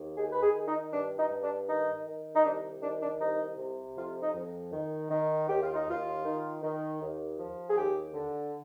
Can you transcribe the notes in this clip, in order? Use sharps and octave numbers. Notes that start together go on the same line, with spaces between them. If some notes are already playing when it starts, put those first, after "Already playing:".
Already playing: D#2
D#3 G#4
B4
G#4
D#3
D#4
G2 D4
D#4
G2
D4
D#3 D#4
D#3
D#4
C2 D4
D#3 D4
D4
C2 D#4
C3
F2 F4
D#4
F2
D#3
D#3
D#2 G4
F4
D#4
D#2 F4
D#3
D#3
D#2
F3
G#4
D#2 G4
D3